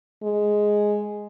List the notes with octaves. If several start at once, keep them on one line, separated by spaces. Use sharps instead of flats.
G#3